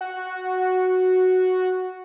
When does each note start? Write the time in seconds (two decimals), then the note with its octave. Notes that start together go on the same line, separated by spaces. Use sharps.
0.01 F#4